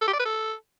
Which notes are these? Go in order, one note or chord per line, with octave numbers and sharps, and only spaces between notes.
A4
G4
D5
B4
A4